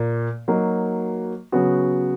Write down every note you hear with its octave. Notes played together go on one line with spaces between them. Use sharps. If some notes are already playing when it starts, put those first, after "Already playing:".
Already playing: A#2 A#3
F#3 A#3 D#4 F#4
C#3 F#3 B3 F#4